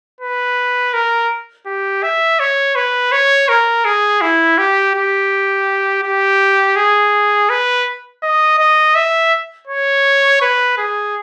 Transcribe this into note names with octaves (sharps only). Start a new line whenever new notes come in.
B4
A#4
G4
E5
C#5
B4
C#5
A#4
G#4
E4
G4
G4
G4
G#4
B4
D#5
D#5
E5
C#5
B4
G#4